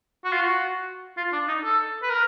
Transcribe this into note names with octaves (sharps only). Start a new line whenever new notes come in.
F#4
F4
F#4
F4
D4
D#4
A4
B4
A#4